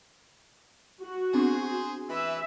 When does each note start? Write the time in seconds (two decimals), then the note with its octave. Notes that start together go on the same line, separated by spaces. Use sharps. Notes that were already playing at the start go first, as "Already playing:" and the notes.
1.02 F#4
1.34 B3 C4 D4 G#4 C5
2.10 E3 B4 E5